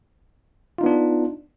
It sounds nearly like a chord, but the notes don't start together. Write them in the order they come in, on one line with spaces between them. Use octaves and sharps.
F4 D#4 B3 D4